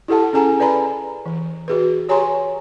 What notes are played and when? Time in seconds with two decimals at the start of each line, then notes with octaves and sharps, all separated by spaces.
0.08 E4 G4 A4 F#5 A5
0.33 C#4 G#4 A4 G#5 A#5
0.60 B4 D5 G#5 A#5 B5
1.26 E3
1.68 F#4 G#4 B4
2.09 G4 C#5 G#5 A#5 C6 C#6